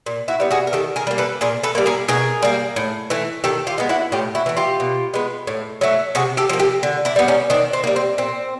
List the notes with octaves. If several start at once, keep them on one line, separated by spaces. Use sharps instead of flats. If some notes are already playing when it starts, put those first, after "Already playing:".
A#2
E4 F#4
G3 B3
F#4 G#4
A#4
D#3 G4 A4
G#4 A#4
G3 A#3
A4 B4
A#2 G#4 A#4
A4 B4
G3 A#3
G#4 A#4
B2 G#4 A#4
G3 A#3
A2
E3 A3
D#3 G4 A4
F4 G4
G#3 B3
E4 F#4
A2 F4 G4
E4 F#4
E3 A3
F4 G4
B2
G#3 B3
A2
F#3 A3
C3 F#4 G#4
G4 A4
F3 A#3
G4 A4
D3
D4 E4
G3 B3
C#4 D#4
D#3 C4 D4
C4
G3 A#3
C4
A#2 C4